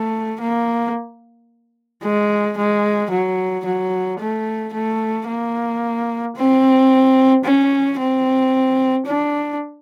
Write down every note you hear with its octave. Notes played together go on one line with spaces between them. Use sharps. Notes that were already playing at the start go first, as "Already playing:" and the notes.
Already playing: A3
A#3
G#3
G#3
F#3
F#3
A3
A3
A#3
C4
C#4
C4
D4